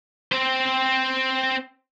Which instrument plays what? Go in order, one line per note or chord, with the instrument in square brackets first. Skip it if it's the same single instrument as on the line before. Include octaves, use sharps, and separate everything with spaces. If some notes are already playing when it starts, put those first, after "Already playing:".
[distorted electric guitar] C4 C5